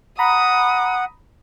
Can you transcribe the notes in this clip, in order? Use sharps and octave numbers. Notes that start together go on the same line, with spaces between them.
F#5 A#5 B5 D#6